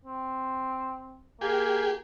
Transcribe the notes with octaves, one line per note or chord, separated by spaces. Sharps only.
C4
A#3 G4 G#4